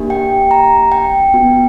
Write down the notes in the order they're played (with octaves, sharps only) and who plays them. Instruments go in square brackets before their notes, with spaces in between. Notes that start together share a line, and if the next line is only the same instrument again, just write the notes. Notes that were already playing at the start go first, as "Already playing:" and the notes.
Already playing: [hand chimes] A#3 D4 G4
G5
A#5
G5
B3 F#4